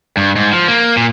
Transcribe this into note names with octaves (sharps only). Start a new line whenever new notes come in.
G2
G#2
F3
A#3
A#2